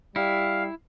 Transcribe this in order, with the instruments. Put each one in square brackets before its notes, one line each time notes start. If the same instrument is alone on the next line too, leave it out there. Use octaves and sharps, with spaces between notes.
[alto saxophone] G3 [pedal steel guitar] E4 [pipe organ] F5